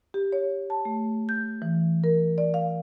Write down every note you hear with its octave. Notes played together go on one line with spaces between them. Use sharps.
G4
C#5
A5
A3
G6
E3
A#4
D5
F5